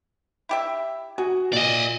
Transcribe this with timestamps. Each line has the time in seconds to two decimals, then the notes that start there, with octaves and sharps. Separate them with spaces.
0.49 E4 G4 E5
1.18 F#4 G#4
1.53 A#2 D5 D#5